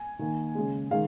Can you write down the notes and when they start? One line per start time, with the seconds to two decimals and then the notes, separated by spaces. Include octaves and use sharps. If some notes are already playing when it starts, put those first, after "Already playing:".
Already playing: G#5
0.19 D#3 A#3
0.55 C#3 G#3
0.91 D#3 G#3 F5